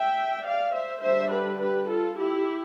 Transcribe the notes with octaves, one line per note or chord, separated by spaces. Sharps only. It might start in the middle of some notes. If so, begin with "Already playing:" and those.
Already playing: E5 G5
D5 F5
C5 E5
D3 G3 D4 C5 E5
G4 B4
G4 B4
F4 A4
E4 G4